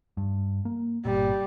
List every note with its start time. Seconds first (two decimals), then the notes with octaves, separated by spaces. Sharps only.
0.17 G2
0.65 A#3
1.05 G1 A#2 G3